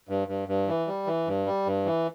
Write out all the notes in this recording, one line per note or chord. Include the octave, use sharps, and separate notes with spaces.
G2
G2
G2
E3
G3
E3
G2
G3
G2
E3